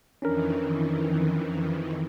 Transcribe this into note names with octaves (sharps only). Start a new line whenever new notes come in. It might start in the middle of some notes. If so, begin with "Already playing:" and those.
F2 D#3 E3 C#4 D4 A#4